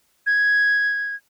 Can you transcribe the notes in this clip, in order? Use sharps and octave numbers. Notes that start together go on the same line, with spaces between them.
G#6